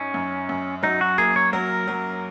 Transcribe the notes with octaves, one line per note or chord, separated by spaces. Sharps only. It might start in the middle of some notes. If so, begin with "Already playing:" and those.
Already playing: F#2 C#4 D#4
F#2
F#2
F#3 D#4
F#4
A#3 G#4
C#5
F#3 A#4
F#3